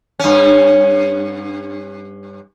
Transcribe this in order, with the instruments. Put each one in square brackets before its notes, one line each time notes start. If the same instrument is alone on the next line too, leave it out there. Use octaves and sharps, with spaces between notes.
[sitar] G2 C#4